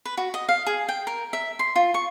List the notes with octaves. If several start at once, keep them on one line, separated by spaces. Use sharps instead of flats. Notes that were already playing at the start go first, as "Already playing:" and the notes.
B4
F#4
D#5
F5
G#4
G5
A#4
E5
C6
F4
C#6